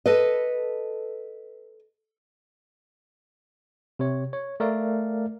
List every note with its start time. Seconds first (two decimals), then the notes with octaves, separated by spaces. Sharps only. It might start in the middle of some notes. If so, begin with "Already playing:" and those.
0.06 A4 B4 D#5
3.99 C3 C#5
4.33 C#5
4.60 A3 A#4 D5 F5